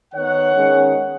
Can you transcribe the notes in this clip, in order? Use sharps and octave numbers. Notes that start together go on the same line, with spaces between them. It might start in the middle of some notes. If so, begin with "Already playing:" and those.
D#3 B3 C#5 F#5
D#3 G#3 C#4